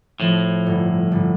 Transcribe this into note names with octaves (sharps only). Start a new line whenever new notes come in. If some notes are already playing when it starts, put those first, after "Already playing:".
A2 F3
G1
G1